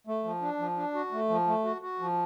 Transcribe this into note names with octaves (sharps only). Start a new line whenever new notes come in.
A3
F3
D4
F3
D4
F#4
A3
F3
A3
F#4
F#4
F3